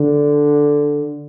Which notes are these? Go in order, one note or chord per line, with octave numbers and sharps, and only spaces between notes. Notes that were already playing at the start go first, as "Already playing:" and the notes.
Already playing: D3